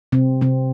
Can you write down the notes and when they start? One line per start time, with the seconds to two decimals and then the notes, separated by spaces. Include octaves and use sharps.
0.12 C3 C4
0.41 C3 C4